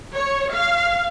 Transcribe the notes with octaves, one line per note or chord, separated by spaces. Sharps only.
C#5
F5